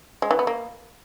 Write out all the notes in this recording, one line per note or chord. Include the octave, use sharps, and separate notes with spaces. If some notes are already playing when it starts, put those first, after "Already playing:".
G#3
E3
B3
A#3